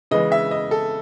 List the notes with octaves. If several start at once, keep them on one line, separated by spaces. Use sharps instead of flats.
C#3 E3 G#3 B3 D#5
E5
D#5
A4